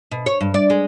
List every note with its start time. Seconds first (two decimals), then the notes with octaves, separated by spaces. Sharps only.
0.11 B2
0.26 C#5
0.41 G2
0.54 D5
0.70 G#3